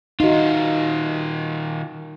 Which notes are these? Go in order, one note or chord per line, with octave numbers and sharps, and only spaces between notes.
D#3 D#4 F4 F#4